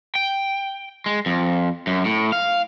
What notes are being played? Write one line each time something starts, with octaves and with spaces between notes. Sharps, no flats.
G5
G#3
F2
F#2
A2
F5